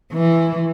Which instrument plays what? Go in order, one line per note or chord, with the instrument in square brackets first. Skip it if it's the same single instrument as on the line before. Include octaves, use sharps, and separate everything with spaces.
[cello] E3